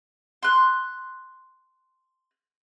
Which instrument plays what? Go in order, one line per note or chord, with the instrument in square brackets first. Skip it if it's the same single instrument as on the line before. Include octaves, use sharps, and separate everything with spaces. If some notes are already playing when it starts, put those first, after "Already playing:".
[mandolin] C6 F#6